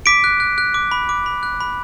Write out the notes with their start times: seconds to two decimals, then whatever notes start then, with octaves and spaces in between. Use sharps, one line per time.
0.06 D6 B6 D7
0.24 F#6
0.40 F#6
0.58 F#6
0.74 D6
0.92 B5
1.09 D6
1.26 B5
1.43 F#6
1.61 B5